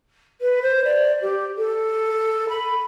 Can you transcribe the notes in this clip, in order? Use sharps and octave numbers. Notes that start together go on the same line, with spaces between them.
B4
C5
D5
G4
A4
B5